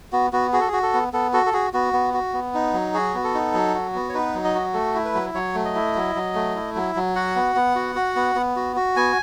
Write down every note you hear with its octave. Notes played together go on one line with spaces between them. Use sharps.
B3 F#4
B3 F#4
F#4 G#4
A4
F#4 G#4
A4
B3
B3 A4
F#4 A4
A4
F#4 G#4
B3 F#4
B3
F#4
B3
D#4
F#3
F#4 G#4
B3
A4
D#4
F#3
F#4
B3
C#5
D#4 B4
F#3
D#5
F#4
A3 A4
E4
B4
F#3
F#3 C#5
A3
D#5
E4
F#3
F#3
A3
E4
F#3
F#3
F#4 F#5
B3
B3
F#4
F#4
B3
B3
F#4
F#4
B3 G#5